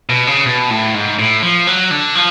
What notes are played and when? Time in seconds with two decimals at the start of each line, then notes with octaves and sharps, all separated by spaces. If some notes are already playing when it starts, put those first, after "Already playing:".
0.09 B2
0.27 C#3
0.46 B2
0.70 A2
0.94 G#2
1.19 A2
1.43 F3
1.67 F#3
1.91 D3
2.15 F3